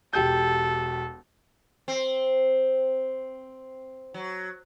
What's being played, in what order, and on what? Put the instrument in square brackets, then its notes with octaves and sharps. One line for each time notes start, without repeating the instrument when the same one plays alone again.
[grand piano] E1 G4 G6 [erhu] A4
[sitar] C4
F#3